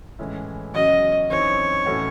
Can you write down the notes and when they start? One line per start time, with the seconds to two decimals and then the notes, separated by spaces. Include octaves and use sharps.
0.19 A2 E3 G#3 C#4 E4
0.74 E2 C#3 F#3 C#4 F#4 D#5
1.30 F#2 E3 C4 D#4 C#5
1.86 A2 E3 A3 C#4 F#4